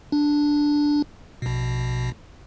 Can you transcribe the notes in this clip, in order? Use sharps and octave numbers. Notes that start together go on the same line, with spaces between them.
D4
A#1 B2